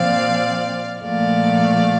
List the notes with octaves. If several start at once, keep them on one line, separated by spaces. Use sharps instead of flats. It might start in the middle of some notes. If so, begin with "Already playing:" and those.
Already playing: A#2 F3 C4 D5 F5
A#2 F3 A3 D5 F5